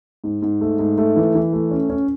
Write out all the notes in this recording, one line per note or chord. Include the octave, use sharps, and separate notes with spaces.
G#2
G#2
A3
G#2
A3
E3
E3
A3
C#4
C#4